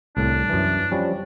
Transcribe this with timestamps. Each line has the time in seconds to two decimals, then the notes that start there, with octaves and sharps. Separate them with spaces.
0.17 C2 A2 D4
0.50 F#2 E3
0.92 F3 G3 C#4